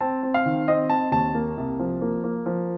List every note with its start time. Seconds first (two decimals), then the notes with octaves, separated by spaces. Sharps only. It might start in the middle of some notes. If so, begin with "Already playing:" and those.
0.01 C4 A5
0.23 C4
0.34 F5
0.45 D#3
0.68 C4 D#5
0.90 C4 A5
1.12 D#2 A5
1.34 A#3
1.57 C2
1.79 F3
2.01 A#3
2.24 A#3
2.46 F3